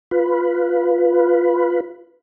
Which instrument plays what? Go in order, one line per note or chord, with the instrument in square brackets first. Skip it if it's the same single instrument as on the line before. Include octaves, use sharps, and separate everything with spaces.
[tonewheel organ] F4 B4